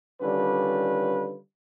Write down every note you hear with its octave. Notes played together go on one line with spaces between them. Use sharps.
D3 D#3 G3 C#4 F4 B4